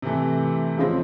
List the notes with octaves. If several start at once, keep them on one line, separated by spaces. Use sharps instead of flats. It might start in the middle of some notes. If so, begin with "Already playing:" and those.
C3 E3 A3
C#2 C#3 F3 G#3 C4